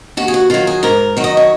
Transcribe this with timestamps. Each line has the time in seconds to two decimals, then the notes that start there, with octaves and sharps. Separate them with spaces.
0.17 D#2 F#4
0.28 G#4
0.34 F#4
0.50 D#3 F#3 F4
0.67 G#4
0.83 G#2 A#4
1.17 D#3 F#3
1.24 D#5
1.37 C#5